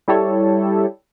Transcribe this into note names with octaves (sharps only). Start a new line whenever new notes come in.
G3 E4 G4 A4 C#5